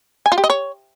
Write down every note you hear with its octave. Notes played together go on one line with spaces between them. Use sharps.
G#5
F4
G4
D#5
C#5